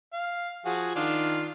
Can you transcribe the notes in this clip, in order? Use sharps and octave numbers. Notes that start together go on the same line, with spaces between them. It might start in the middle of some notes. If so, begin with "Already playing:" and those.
F5
F3 F#4 G#4
D#3 D4 F4